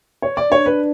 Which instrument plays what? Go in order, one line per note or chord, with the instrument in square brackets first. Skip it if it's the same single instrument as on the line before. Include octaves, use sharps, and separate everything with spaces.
[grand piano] C#5
D5
[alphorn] D4 [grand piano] C#5
[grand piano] B4